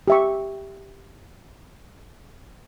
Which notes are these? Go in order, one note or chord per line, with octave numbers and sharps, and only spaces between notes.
G4 E5 C#6